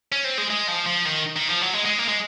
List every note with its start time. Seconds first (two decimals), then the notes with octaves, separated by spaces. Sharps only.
0.12 C#4
0.24 C4
0.38 G#3
0.50 G#3
0.68 F3
0.86 F3
1.05 D#3
1.36 D#3
1.49 F3
1.62 F#3
1.74 G#3
1.85 G#3
1.98 A#3
2.09 G#3